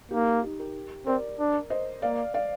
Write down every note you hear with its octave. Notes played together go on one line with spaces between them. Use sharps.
A#3 D#4 G4
D#4 G4
G4 A#4
C4 A#4 D5
D4
C5 D#5
A#3 D5 F5
D5 F5